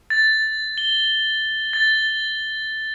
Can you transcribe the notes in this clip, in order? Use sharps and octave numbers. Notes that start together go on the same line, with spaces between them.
A6
G7
A6